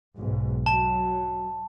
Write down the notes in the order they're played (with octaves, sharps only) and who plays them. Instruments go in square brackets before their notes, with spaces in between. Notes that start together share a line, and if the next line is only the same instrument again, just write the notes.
[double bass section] B1 G#2
[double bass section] F#3 [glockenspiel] A5